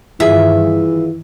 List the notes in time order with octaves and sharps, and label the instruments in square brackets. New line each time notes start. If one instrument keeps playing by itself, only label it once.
[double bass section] G2 D#3 [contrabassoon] E3 [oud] F4 G#4 [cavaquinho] E5